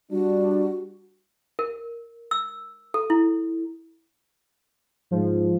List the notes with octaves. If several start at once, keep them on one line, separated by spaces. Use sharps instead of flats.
G3 D4 F#4
A#4
E6
A4
E4
G#2 F3